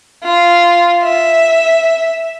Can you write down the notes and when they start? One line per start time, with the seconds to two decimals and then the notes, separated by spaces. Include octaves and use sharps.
0.24 F4
1.04 E5